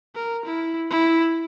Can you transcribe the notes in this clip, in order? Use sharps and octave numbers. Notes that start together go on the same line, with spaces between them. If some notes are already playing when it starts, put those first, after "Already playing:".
A#4
E4
E4